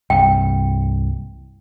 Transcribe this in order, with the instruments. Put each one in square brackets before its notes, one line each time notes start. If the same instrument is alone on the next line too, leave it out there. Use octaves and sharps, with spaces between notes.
[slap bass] C2 G2 [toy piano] G5